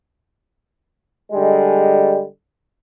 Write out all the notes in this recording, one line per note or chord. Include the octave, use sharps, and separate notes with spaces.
D3 G3 G#3